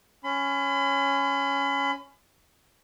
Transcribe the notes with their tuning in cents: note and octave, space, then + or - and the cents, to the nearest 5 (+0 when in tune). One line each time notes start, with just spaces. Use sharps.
C#4 +0 B5 +40